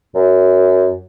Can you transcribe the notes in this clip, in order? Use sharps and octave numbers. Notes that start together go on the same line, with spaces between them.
F#2